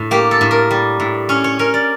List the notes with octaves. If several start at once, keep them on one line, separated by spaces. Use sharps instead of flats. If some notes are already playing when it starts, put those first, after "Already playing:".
Already playing: A2
A#3 G4
A4
A2
A#4
G3
A2
C#4 C#5
C#5
C#4 A#4
D5